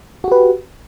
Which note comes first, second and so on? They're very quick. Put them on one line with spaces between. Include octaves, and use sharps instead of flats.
F#4 G4 B4